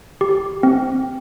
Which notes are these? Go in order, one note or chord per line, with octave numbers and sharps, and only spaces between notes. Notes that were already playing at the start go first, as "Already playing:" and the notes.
G4
C4